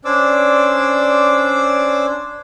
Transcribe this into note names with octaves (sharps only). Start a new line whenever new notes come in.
C#4 D4 C5 D5 D6 E6